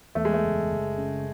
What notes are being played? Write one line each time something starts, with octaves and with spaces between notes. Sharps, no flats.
E2 A3
G#3
A3
F#1
F#1
C#3